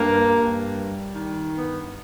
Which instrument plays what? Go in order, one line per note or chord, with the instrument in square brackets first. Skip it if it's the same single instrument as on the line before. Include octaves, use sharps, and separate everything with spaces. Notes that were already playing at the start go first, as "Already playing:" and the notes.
Already playing: [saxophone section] G2 A#3
G2
G3
D#3
G2 B3